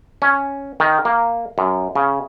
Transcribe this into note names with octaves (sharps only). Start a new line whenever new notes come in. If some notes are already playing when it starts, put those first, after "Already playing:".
C#4
D#3
A#3
F#2
C#3